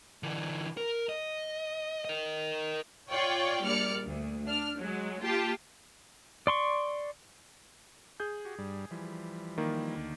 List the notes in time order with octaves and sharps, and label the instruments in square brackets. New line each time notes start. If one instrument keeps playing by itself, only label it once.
[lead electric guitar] D3 E3
A#4
D#5
A#4 D#5
[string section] F4 C#5 D5 G5 C#6
A#1 G3 D5 F6 C#7
D2
D4 F6
F#3 G#3
A#3 F4 G4 G5 A5
[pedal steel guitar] D5 C6 C#6
[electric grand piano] G#4 G6
[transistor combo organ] F#4 G4
G2 G3
E3 F3 G3
[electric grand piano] D#3 A#3
[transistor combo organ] D2